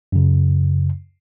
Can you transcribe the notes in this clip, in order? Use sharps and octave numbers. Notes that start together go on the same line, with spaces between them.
F#2 C#3